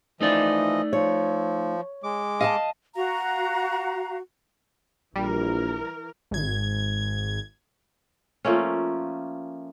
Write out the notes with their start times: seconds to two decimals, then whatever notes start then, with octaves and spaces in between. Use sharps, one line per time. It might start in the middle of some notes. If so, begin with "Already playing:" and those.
0.21 E3 F3 A3 D#4 D5 D#5
0.93 F3 C#5
2.03 G#3 D6
2.41 D#5 F5 G5 A5
2.95 F#4 F5 A#5
5.16 A#1 E3 G3 A#4
6.31 G#1 G#6
8.45 F3 A3 A#3 C#4